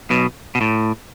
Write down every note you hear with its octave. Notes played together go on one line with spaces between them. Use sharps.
B1 B2
B2
A2